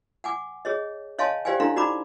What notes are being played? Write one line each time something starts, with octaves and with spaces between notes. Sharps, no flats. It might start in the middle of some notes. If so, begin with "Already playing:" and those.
F#5 G#5 D6
G#4 C#5 D#5
C#5 D#5 F5 G#5 A5 C6
G4 C5 D5 F5 G5 G#5
D4 E4 A4 F5 A#5 C6
D#4 F#4 D5 A#5 B5 D6